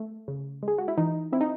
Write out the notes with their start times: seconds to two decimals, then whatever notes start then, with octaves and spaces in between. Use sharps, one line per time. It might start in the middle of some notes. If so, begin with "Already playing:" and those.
Already playing: A3
0.28 C#3
0.63 G#3
0.68 G#4
0.78 F#4
0.88 E4
0.97 E3 D#4
1.32 C4 E4
1.41 D#4